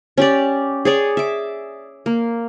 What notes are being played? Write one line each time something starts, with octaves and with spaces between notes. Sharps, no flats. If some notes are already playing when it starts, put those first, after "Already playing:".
C#4 G4 D5
G#4 C#5 D5
E5 D6
A#3